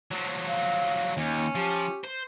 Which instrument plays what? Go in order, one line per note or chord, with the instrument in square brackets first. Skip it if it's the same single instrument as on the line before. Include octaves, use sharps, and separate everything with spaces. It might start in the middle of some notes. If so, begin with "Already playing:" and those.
[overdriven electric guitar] F3 F#3
[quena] F5
[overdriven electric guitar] D#2 [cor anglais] C#4
[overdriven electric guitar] F3 [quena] G4
[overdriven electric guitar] C5